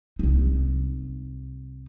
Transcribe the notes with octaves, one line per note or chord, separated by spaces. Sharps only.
C2 D#4